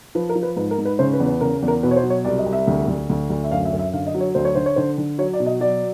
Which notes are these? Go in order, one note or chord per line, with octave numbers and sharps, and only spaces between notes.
F3 B4
A#4
F3
B4
G#2 B4
A#4
G#2
B4
C#3 C5
B4
E2
B4
C#3 A#4
E2
A#4
B2 B4
C#5
C5
F#3
C#5
C2 D5
D#5
C2
E5
D2
D2
D2
D2
E5
F#2 F5
E5
F#2
E5
D3 F5
D#5
F#3
C#5
D2 C5
C#5
D3 C5
C#5
D3 C5
D3
F#3 C#5
D5
B2
D#5
F#3 D5